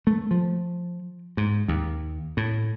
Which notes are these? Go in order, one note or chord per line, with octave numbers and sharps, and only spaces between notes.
A3
F3
G#2
D#2
A2